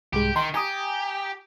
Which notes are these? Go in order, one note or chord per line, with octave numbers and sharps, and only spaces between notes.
C2 G#2 G#3 G4
D#3 G5 A#5 C6
G4 G#5 A#5 D#6